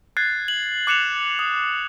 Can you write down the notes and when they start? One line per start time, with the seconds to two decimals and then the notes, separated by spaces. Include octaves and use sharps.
0.17 F#6 G#6 A6 C7
0.48 F#7
0.87 D6 F#6 C#7 E7 F7
1.39 D#6